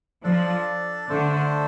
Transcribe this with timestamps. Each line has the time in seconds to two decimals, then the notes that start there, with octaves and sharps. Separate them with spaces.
0.23 F3 D4 A4 D5
1.09 D3 A3 D4 A4 C5